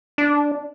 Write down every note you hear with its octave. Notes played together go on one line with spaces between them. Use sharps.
D4